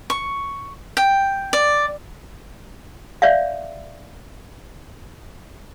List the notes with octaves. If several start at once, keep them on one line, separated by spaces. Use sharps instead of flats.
C#6
G5
D5
C#5 D5 E5 F5